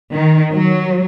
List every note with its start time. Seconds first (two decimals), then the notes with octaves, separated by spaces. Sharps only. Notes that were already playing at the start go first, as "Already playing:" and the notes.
0.13 D#3
0.52 F#3